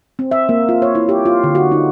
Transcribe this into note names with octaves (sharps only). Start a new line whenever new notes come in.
C4
E5
A#3
F4
C#5
E4
G4
F4
D3
F#4
D#4